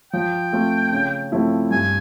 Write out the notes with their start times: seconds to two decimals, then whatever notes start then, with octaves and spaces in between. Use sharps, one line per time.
0.13 F3 G5
0.53 A3 C4 F4
0.92 C#3
1.32 F3 A3 C4 E4
1.71 G2 G#5